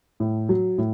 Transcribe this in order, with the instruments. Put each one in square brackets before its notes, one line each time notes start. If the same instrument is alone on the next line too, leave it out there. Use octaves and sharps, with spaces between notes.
[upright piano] A2
F#3
A2